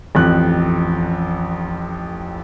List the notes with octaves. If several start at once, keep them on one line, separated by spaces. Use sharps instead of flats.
A1 F2 F#6